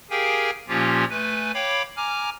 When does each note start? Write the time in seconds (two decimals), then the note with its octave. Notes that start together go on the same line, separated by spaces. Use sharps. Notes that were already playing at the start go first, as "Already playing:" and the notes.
0.10 G4 G#4 A#4 F5 G5 G#5
0.68 A#2 F3 A#3 C#4 F4 G4
1.10 A3 B4 G#5
1.54 C#5 F5 G5 B5 D6
1.97 G#5 A#5 D6 F6